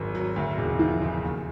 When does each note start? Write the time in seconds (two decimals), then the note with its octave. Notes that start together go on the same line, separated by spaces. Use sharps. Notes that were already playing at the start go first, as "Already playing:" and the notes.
Already playing: G#1 F#2 F#3
0.15 F#3
0.36 D2
0.57 E1
0.79 F3
1.01 C#3
1.23 D#2